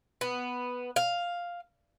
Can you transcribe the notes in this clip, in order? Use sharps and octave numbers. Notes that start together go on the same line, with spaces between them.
B3
F5